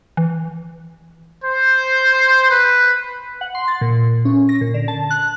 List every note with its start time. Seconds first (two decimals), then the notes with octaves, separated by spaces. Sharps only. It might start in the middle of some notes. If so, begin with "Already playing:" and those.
0.17 E3
1.44 C5
2.51 B4
3.41 F#5
3.55 C6
3.68 A6
3.81 A#2
4.25 C#4
4.49 A#6
4.61 A#2
4.74 D3
4.88 A5
5.10 F#6